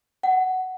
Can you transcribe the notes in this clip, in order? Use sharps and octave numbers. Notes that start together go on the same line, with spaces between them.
F#5